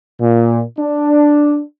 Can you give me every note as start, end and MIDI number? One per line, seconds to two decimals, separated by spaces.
0.20 0.63 46
0.79 1.61 62